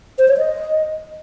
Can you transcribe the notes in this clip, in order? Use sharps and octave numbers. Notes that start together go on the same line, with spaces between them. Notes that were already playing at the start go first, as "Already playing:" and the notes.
C5
C#5
D#5